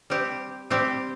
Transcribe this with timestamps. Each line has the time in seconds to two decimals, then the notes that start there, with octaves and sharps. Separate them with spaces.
0.10 G3 C4 G4
0.70 G3 C4 G4